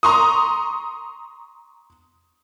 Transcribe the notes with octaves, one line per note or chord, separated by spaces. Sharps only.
A#5 C6 C#6 D#6